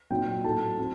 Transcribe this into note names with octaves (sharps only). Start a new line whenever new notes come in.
A#2 F#3 C4 D#4 G5
A2 F#3 A3 D#4 A5
F#3 C4